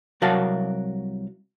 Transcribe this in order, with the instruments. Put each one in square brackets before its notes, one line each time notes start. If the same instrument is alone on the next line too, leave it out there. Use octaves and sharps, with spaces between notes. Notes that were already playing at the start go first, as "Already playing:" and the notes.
[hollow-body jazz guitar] C2 F#3 F#4 A#4 F5 A5